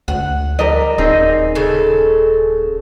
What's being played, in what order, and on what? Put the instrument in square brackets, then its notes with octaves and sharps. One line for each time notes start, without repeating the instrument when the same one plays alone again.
[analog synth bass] D2 [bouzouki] F#5
[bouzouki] G3 [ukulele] A#4 D#5
[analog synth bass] D#1 [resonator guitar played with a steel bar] C4 D#4 G#4
[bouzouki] C#3 A4